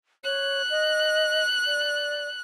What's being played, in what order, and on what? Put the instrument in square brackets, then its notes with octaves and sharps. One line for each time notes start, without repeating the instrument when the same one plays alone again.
[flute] C#5 [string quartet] F#6
[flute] D#5
D5